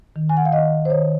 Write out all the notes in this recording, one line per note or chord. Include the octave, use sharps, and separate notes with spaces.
D#3
G#5
F#5
F5
D#3 D#5
C5
D#3 C#5